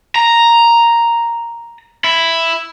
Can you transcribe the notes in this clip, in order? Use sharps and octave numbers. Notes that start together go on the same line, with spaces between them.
A#5
E4